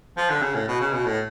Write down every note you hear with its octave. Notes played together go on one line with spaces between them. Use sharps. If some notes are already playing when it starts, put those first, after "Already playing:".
F3
D3
C#3
A2
B2
C#3
B2
A2